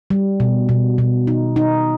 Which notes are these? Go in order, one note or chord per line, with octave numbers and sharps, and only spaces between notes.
G3
B2
B2
B2
D#4
D#4